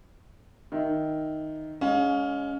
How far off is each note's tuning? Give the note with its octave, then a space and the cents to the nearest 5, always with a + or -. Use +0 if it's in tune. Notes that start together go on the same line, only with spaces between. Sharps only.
D#3 +0 E5 +0
G#3 +0 C#4 +20 F5 +35